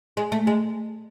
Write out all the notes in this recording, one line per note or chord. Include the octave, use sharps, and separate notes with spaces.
G#3
A3
G#3